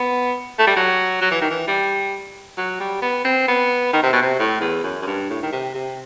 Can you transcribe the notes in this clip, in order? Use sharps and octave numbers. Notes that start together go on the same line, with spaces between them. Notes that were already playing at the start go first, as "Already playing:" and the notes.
Already playing: B3
A3
G3
F#3
F#3
E3
D#3
E3
G3
F#3
G3
B3
C4
B3
D#3
C3
B2
C3
A2
E2
F#2
F#2
G2
A2
D#3
C3
C3